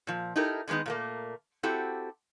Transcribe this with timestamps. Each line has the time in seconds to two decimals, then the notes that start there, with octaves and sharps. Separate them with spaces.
0.07 A#2 F3
0.36 D#4 E4 G4 A4 A#4
0.68 D3 D#3 G#3 B3 D#4
0.86 A#2 A3 A#3
1.63 C4 E4 F#4 G4 A4